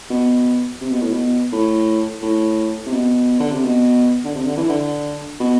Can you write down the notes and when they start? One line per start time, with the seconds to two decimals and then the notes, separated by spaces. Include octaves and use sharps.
0.10 B2
0.81 C3
0.92 B2
1.01 A2
1.12 B2
1.53 A2
2.22 A2
2.86 C3
2.93 B2
3.40 D3
3.52 C3
3.64 B2
4.25 D3
4.35 C3
4.46 D3
4.57 E3
4.69 D3
5.40 B2